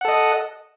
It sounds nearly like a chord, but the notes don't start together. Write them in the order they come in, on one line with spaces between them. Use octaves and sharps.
F#5 A4 D#5